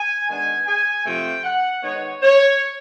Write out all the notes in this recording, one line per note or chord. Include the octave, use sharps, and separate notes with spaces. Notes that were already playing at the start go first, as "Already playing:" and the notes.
Already playing: G#5
D#3 G#3 B3 D4 G#5
G#5
C3 F3 A3 C4 F4 G5
F#5
D#3 G#3 B3 D#4 C#5
C#5